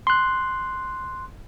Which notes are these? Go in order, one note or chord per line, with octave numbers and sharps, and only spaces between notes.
C6 F#6